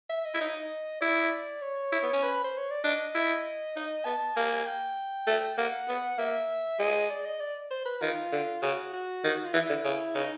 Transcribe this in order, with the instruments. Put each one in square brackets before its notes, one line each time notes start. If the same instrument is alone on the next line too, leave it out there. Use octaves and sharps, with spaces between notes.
[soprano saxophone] E5
D#5
[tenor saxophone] E4
D#4
[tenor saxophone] E4 [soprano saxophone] D5
[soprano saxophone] C#5
[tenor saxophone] E4
B3
C#4
[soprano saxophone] B4
C5
C#5
D5
[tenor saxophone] D4 [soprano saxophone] D#5
[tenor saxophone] E4
D#4
[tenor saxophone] B3 [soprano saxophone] A5
[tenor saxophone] A#3 [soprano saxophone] G#5
[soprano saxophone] G5
[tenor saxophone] A3
[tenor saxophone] A#3 [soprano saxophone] F#5
[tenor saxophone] B3
[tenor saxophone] A#3 [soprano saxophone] E5
[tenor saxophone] G#3 [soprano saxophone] D#5
[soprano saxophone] D5
D#5
D5
C5
B4
[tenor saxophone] D#3 [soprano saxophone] F4
[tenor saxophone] D3
[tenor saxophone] C#3 [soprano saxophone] F#4
[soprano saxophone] F#4
[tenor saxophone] D#3
[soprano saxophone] F4
[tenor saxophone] E3 [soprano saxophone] E4
[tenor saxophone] D3
C#3
[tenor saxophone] C#3 [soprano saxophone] D#4